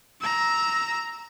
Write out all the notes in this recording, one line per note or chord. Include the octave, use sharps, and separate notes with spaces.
A#5 E6